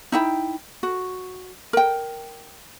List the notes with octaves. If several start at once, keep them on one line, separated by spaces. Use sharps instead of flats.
D#4 E4 G5
F#4
A#4 G5